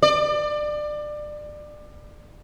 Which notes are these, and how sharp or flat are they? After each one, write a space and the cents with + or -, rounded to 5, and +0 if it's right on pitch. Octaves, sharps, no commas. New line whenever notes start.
D5 +25